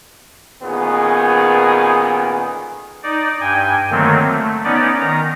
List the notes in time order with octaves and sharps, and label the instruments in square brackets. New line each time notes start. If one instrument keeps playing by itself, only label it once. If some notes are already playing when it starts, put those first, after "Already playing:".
[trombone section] A1 A#2 D#3 B3 G#4
[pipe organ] D#4 D5
G2 G5 G#5
D3 D#3 F#3 A3 A#3 C4
A3
B3 C#4 D#4 D5
D#3 A#5